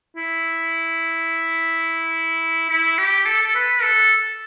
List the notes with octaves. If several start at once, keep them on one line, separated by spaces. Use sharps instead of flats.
E4
E4
G4
A4
A4
B4
A4